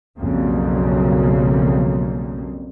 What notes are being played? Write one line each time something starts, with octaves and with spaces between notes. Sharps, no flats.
B1 F2 C#3 F#3 G3 A#3